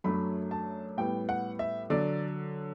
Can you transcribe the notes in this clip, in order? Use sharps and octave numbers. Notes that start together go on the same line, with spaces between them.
F#2 F#3 A3 D4 B5
A5
A2 G3 B3 G5
F#5
E5
D3 F#3 D5